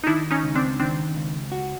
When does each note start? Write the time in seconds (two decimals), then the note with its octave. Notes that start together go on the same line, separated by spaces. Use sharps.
0.03 D#4
0.07 D#3 D4 E4
0.31 C#4 D#4
0.43 C#2
0.55 C4 D4
0.80 D#3 C4 D4
1.16 C#2
1.52 F#4